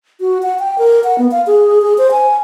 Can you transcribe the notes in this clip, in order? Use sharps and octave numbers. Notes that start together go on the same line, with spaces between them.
F#4
F#5
G5
A#4
F#5
B3
F5
G#4
G#4
C5
G#5